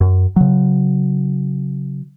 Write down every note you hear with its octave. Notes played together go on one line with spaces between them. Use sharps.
F#2
C#3 F#3